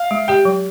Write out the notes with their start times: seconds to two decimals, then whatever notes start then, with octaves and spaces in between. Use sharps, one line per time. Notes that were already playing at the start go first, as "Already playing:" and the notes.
Already playing: F5
0.11 G#3
0.28 G4 G5
0.45 F#3